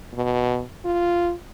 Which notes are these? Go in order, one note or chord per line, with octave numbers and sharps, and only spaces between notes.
B2
F4